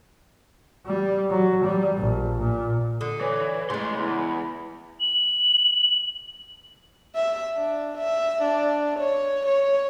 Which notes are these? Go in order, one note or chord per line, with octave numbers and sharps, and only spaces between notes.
G3
F#3
G3
A#1
A#2
D3 D#6
E3 C#5
A2 C#3 G#3 C6
E2 E4
F#7
E5
D4
E5
D4
C#5
C#5